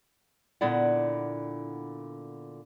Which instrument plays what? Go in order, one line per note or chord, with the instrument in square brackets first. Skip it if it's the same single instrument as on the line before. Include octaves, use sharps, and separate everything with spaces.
[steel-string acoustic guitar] A#2 D3 B3 E4 D5 F#5